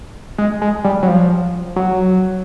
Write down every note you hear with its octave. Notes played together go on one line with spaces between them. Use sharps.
G#3
G#3
G3
F#3
F3
F#3